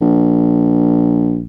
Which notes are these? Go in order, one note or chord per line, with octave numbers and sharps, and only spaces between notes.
A#1